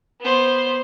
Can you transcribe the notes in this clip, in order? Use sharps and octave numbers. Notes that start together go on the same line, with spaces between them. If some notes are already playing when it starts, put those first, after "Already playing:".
B3 C5